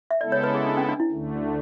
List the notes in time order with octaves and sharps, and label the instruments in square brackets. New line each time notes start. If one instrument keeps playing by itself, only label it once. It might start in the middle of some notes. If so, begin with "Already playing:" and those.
[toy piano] E5
[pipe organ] C#3 G#3 B3 E4 A4 [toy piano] D5
[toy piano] C#5
B4
G#4
D4
C#4
D4
E4
[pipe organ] D2 D3 A3